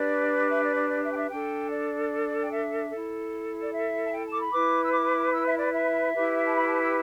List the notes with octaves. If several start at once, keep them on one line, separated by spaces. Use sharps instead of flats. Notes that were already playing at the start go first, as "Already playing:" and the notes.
Already playing: D4 G4 B4 D5
E5
D5
D5
D5
E5
G5
E5
D4 A4 G5
D5
G5
E5
E4 A4
D5
E5
A5
G5
A5
D6
B5
E4 B4 D6
E6
D6
E6
E5
D5
E5
E4 G4 B4
A5
B5
A5
E6